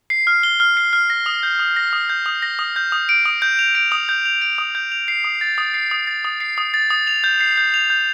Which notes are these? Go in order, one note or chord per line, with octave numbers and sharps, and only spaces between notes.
C7
F6
G7
F6
C7
F6
A#6
D#6
G6
D#6
A#6
D#6
G6
D#6
A#6
D#6
G6
D#6
D7
D#6
G6
F7
D7
D#6
G6
F7
D7
D#6
G6
F7
C7
D#6
A6
D#6
C7
D#6
A6
D#6
C7
D#6
A6
D#6
F7
G6
C7
G6
F7
G6